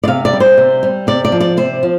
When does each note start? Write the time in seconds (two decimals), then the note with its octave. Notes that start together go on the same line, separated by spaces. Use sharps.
0.04 D5
0.08 C3 F5
0.25 D5
0.33 G3
0.40 C5
0.58 C3
0.83 G3
1.07 C3 D5
1.25 D5
1.32 F3
1.40 D5
1.57 C3 C5
1.83 F3